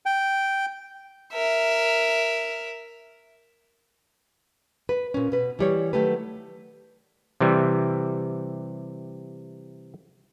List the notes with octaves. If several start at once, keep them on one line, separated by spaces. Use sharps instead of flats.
G5
A#4 E5
B4
A#2 C#4
B2 B4
E3 G3 C#5
D#3 F#3 A3 G4 B4
C3 E3 G3